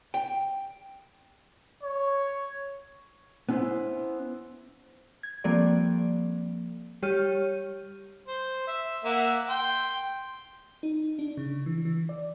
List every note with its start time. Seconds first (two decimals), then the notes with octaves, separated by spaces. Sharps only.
0.14 G5
1.83 C#5
3.49 B3 C#4 E4 C5
5.23 G#6
5.44 F3 G3 A#3 C4 A4 D5
7.02 G3 G4 C#5 F6 D#7
8.28 C5
8.67 E5
9.05 A#3 E5 F#5
9.49 G5 C6
10.83 D#4
11.19 D4
11.37 C#3
11.66 E3
11.85 E3
12.09 D5